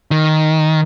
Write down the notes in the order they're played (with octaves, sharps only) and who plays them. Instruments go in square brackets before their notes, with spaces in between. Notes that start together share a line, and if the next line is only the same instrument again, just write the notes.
[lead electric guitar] D#3